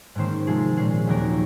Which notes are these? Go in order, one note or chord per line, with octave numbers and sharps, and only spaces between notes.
G#2 D#3 A#3 C#4 C5
C3 F3 G#3 G#4
A#2 G#3 C#4 G#4
D#2 C#3 F#3 A#3 A#4